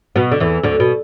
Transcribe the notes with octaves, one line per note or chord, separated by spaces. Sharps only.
B2 B3
D3
E2 E3
D2 D3
B2